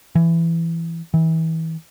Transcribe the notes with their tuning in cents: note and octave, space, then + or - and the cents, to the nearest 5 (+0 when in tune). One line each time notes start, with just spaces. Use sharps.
E3 +15
E3 -35